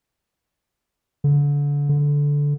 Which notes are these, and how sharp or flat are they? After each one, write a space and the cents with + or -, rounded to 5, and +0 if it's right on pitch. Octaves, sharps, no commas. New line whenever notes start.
D3 -30
D3 -15